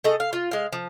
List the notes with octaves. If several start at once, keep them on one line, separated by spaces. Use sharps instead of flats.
A3 G#4 D#5
F5
F4
G#3 F5
F3